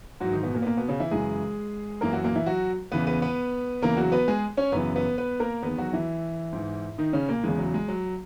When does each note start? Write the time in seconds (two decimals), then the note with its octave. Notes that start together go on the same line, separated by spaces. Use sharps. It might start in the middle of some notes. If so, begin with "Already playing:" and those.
0.20 G#2 E3 F#3 F#4
0.32 D#3 D#4
0.43 B2 B3
0.54 A#2 A#3
0.62 B3
0.66 A#2 A#3
0.77 B2 B3
0.88 C#3 C#4
1.00 E3 E4
1.11 F#2 C#3 E3 G#3 G#4
2.01 F#2 E3 A#3 A#4
2.13 F#3 F#4
2.24 A#2 A#3
2.35 E3 E4
2.46 F#3 F#4
2.92 E2 C#3 E3 B3 B4
3.07 B3 B4
3.22 B3 B4
3.82 E2 C#3 E3 A#3 A#4
3.97 F#3 F#4
4.12 B3 B4
4.28 G#3 G#4
4.57 C#4 C#5
4.72 F#2 C#3 E3 B3 B4
4.95 B3 B4
5.18 B3 B4
5.40 A#3 A#4
5.63 E2 D#3 B3 B4
5.78 F#3 F#4
5.93 E3 E4
6.53 G#2 E3
6.98 D#3 D#4
7.13 C#3 C#4
7.28 A#2 A#3
7.43 E2 C#3 E3 G#3
7.59 F#3
7.74 G#3
7.88 F#3